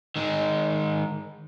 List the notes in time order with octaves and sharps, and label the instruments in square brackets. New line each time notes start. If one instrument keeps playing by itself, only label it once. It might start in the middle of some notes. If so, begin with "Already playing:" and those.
[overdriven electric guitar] D#3 G#3